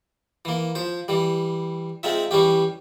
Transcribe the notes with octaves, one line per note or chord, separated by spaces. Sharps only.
E3 A#3
F3 C5
E3 G3
G#3 C4 D#4 F4 E5
E3 G3 C#4 G4